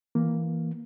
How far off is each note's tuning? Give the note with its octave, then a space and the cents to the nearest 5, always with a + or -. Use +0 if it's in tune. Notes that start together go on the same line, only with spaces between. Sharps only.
E3 +0 A#3 +0